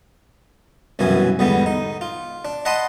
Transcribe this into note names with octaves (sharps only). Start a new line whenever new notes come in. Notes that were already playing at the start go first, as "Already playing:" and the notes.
C2 F#2 B2 E3 G#5
E2 G#2 D3 G3 B3
D#4
F4
D4
D#5 F#5 A5 B5 C6 D#6